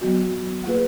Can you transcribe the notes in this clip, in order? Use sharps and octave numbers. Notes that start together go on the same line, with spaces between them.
F#3 B3 F#4
A#3 F4 G#4 B4